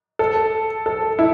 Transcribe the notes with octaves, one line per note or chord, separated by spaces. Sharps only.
A4
A4
E4